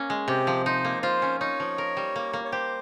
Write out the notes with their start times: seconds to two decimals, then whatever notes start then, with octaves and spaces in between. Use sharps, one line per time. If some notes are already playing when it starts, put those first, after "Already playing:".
Already playing: A#3 C#4
0.10 G#3
0.28 C3 G4
0.47 F3
0.66 D#4 C5
0.85 A#3
1.03 F4 C5
1.22 C#4
1.40 D#4 C#5
1.60 F3
1.78 A#4
1.97 G3
2.16 A#3
2.33 A#3
2.44 C#5
2.52 G4 C5